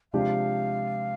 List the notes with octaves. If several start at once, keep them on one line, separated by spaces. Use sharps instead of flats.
C3 F3 G#3 D4 G4 F5